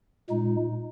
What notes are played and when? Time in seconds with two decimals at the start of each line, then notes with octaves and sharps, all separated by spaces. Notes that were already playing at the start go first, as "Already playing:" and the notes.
0.29 A#2 G#3 D#4